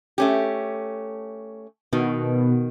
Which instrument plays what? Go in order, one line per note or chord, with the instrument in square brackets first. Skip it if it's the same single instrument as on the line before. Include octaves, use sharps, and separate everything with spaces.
[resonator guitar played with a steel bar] A3 C#4 G4
[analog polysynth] B2 [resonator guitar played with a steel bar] D#3